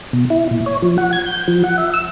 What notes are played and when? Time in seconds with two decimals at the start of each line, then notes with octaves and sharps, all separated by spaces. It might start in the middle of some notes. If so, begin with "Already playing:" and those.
0.13 B2
0.30 E4
0.51 A#2
0.66 C#5
0.82 F3
0.98 F#5
1.13 G#6
1.26 G6
1.48 F3
1.64 F#5
1.78 E5
1.94 E6